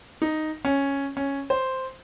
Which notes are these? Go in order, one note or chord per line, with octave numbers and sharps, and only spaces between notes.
D#4
C#4
C#4
C5